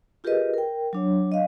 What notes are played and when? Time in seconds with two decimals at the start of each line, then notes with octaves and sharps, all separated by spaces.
0.24 F4 G4 G#4 A#4 B4 D#5
0.54 A#4 G5
0.93 F#3 D4 C#5
1.32 D#5 F5